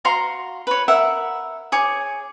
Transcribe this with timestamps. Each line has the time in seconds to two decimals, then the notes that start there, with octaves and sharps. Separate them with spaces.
0.05 F#4 F5 A#5 C6
0.67 B4 C#5
0.88 A#4 E5 F#5
1.72 G#4 C#5 D6